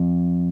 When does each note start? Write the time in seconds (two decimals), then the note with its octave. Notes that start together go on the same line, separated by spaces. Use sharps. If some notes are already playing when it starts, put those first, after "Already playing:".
Already playing: F2